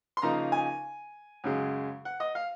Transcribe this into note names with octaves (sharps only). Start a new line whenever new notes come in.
C6
C#3 F3 A#3 D#4 A#5
G#5
F#2 C#3 G#3
F#5
D#5
F5